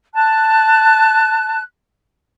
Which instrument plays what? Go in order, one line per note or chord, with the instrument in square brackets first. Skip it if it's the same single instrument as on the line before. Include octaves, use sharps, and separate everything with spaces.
[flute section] A5 F#6